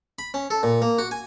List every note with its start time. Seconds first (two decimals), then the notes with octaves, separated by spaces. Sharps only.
0.19 B5
0.34 C#4
0.50 A4
0.63 A#2
0.82 A#3
0.98 F#4
1.11 G#5